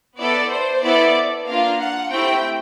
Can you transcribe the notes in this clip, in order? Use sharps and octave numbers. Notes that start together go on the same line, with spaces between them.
B3 E4 A4 D5
C5
B3 E4 A4 D5
A#3 D4 F4 F5
F#5
A3 C4 E4 G4 G5